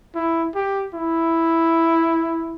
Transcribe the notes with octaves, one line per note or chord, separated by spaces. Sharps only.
E4
G4
E4